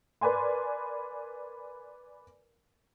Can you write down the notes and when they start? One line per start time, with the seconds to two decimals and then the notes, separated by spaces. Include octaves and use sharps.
0.21 A#4 B4 D5 G#5 C6